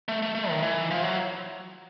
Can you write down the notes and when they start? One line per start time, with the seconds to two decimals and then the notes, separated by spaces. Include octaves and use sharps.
0.08 A3
0.22 A3
0.35 A3
0.50 D#3
0.63 E3
0.91 F3
1.03 F#3